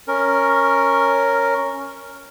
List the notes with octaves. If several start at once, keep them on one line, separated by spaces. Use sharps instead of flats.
C#4 A#4